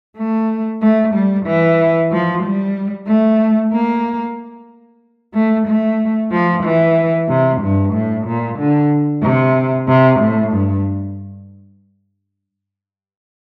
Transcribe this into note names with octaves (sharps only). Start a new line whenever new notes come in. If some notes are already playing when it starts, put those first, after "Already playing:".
A3
A3
G3
E3
F3
G3
A3
A#3
A3
A3
F3
E3
C3
G2
A2
A#2
D3
C3
C3
A2
G2